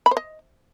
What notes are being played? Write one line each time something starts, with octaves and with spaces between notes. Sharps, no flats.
B5
C5
D#5